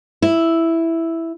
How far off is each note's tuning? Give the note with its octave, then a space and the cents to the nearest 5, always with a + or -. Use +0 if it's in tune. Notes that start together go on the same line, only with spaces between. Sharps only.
E4 +0